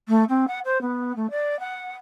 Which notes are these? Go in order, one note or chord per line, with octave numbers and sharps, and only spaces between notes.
A3
C4
F#5
C5
B3
A3
D5
F#5